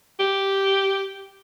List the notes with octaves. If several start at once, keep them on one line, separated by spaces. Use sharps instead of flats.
G4